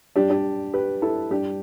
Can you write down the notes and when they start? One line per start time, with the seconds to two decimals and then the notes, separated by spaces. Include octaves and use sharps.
0.16 G2 G3 D4 G4
0.30 D4 G4
0.74 G4 B4
1.02 E4 A4
1.30 G2 G3 D4 G4